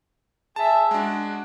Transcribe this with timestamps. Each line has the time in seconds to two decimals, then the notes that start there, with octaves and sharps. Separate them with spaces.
0.56 G#4 E5 A5
0.91 G#3 D4 F#4